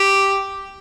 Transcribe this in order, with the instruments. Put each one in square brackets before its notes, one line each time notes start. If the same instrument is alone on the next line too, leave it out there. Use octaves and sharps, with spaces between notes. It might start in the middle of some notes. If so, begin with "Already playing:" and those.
Already playing: [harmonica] G4